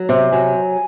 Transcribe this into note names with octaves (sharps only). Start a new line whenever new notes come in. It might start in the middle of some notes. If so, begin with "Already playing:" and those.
Already playing: F#3
C3
F#3 G#5